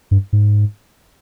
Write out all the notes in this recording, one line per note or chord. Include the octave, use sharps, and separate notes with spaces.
G2
G#2